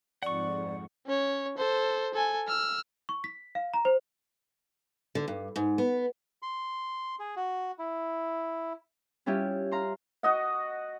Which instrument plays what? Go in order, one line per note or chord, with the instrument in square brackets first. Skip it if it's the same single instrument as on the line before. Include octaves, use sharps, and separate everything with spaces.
[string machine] F2 G#2 [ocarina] D5 [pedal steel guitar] F#5 C#6
[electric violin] C#4 C#5
A4 C5
A4 G#5
E6 F6
[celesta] C#6
B6
F5
A#5
C5
[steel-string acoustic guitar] D3
G2
G#2
B3
[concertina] C6
G#4
F#4
E4
[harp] G3 C#4 E4 F4 G4
F5 A#5 C6
[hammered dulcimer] F#4 D#5 F#5